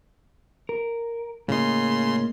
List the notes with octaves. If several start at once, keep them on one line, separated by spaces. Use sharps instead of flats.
A#4
A2 C#3 A#3 D#5 C6